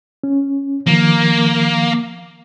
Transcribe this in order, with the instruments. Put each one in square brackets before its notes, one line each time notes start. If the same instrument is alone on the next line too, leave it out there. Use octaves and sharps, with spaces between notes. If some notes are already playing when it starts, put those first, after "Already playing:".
[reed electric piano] C#4
[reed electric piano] D#3 F3 [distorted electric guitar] A#3